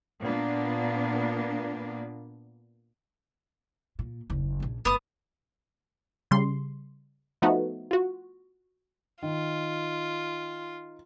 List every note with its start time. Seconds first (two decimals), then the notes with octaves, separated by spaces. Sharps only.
0.22 A#2 A#3 B3 D4
3.99 A#2
4.30 F#1 D#2
4.60 A#1 C#4
4.85 G1 A3 B3 D#6
6.31 C#3 G3 C6
7.42 F3 A3 B3 D#4 F#4
7.91 F4 F#4
9.22 D#3 F4